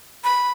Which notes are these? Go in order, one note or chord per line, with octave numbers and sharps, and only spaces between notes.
B5